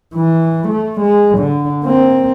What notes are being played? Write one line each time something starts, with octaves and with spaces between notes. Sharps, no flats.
E3
A3
G#3
D3
A#3 C4